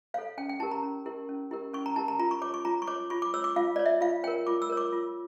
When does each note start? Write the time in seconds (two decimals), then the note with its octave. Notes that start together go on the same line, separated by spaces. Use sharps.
0.14 C#5 F5
0.18 A4
0.38 C#4 G5
0.49 G5
0.60 E4 G4 A#4 A5
0.71 A#5
0.83 C#4
1.06 E4 G4 A#4
1.29 C#4
1.51 E4 G4 A#4
1.73 C#4 C#6
1.86 A#5
1.96 E4 G4 A#4 A5
2.08 A#5
2.19 F4 A#5
2.31 C#6
2.42 C#5 D6
2.54 C#6
2.65 F4 A#5
2.82 C#6
2.87 C#5 D6
3.10 F4 C#6
3.22 D6
3.34 C#5 E6
3.44 D6
3.56 F4 F5
3.76 C#5 D5
3.86 E5
4.01 F4 F5
4.24 C#5 G5
4.28 A#4
4.47 F4 D6
4.62 E6
4.70 A#4 C#5
4.77 D6
4.92 F4